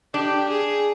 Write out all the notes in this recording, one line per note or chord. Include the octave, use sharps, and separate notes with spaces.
D4 G4
G#4